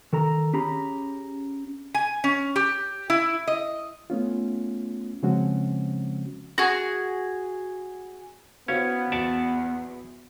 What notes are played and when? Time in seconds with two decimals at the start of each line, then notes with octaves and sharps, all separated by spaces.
0.13 D#3 A4 A#5
0.53 C#4 G4 G#4 A#5 B5
1.94 G#5
2.24 C#4
2.56 G4
3.10 E4
3.47 D#5
4.10 A3 B3 C#4 F4
5.23 C#3 F3 G#3 C4 C#4 F#4
6.58 F#4 G#4
8.68 B3 C#4 E4 F#4 C5 C#5 F5
9.12 E2 F#4 D5 E5 A5 C#7